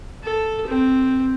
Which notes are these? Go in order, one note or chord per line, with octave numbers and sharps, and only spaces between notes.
A4
C4